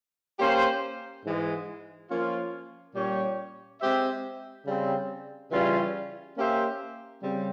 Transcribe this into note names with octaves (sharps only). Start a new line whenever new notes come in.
A#3 C#4 G4 C5
G#2 E3 G#3
F3 A#3 C#4 F4
A#2 G3 C#4 G4 C#5
G#3 C4 G4 C5 E5
C#3 G3 C4
C#3 E3 G3 C#4 F4
A#3 C#4 G4 C5 E5
C#3 G3 C4